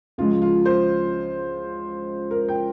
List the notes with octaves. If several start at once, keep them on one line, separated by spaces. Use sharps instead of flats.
C#2 C#3 F3 G#3 F4
F4
C5
A#4
G5